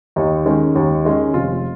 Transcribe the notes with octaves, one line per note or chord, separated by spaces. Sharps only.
D#2 D#4
D#3 G#3 C#4
D#2
D#3 G#3 C#4
F1 F4